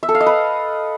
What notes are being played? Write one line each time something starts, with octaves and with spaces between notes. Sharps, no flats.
E5
A4
F5
D#5
B4